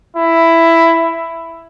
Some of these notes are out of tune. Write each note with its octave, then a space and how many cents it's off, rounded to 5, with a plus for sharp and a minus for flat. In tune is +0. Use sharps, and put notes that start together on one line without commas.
E4 +5